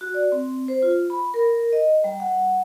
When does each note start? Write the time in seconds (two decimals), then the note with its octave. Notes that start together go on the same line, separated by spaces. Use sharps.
0.01 F#4
0.14 D5
0.32 C4
0.68 C5
0.82 F4
1.10 B5
1.34 A#4
1.72 D#5
2.04 G3
2.20 F#5